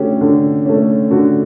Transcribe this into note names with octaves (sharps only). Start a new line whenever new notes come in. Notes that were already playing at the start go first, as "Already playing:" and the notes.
Already playing: D3 A3 C#4 F#4 G4
D3
A3 C#4
D3 F#4